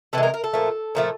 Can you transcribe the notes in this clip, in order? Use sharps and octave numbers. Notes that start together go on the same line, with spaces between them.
C3 E3 G#3 A4
A#4
A#4
A4
A#2 F3 A3
A#2 F3 A3